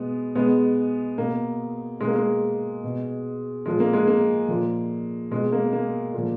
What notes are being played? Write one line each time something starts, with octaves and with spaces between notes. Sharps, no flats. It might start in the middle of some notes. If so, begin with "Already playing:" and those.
Already playing: B2 G#3 B3
B2 G#3 B3
B2 A#3
B2 G#3
A#3
G#3
B2
A#2 F3 G#3
A#3
G#3
A#3
A#2 F3
B2 G#3
A#3
A#3
A#2 F3